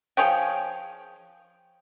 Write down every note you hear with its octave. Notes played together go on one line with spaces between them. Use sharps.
F3 G#4 C#5 G5